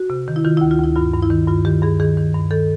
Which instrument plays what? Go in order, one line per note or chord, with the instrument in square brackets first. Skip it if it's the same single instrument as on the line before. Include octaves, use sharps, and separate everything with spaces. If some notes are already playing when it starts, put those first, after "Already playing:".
Already playing: [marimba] F#4
C3
D#3
E4
D#3 F4
D2 E4
F4
D2 E4
G2 F4
G2
E4
D#3
G2 F4
D#3 G4
G2 G#4
D#3 G#4
D#3
G2
D#3 A4